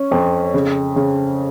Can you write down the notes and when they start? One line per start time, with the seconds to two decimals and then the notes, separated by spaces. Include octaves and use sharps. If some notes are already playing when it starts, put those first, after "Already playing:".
Already playing: C#4
0.11 F2
0.54 C#3
0.96 C#3